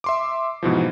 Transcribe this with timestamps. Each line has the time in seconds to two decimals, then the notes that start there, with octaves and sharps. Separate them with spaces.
0.04 E5 C6 D6
0.63 G#2 B2 E3 F3